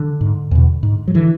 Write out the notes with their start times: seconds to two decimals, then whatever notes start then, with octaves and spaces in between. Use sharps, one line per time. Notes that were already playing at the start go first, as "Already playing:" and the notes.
Already playing: D3
0.21 G#2
0.51 E2 B2
0.83 G#2
1.08 F#3
1.14 D3 E3